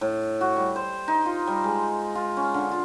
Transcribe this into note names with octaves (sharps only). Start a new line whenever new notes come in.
A2
F#4
G3
C5
D#4
F4
G3
G#3
F4
C#4
D3
F4